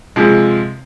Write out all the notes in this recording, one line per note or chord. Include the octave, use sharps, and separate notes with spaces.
C3 F3 G#3